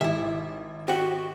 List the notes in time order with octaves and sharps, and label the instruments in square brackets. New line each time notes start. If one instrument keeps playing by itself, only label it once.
[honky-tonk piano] G#1 D6 [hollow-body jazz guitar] E4 E5
[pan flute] F#4 [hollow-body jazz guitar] G4 F#5